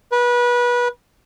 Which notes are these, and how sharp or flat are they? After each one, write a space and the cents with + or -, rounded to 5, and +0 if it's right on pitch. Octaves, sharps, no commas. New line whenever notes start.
B4 -25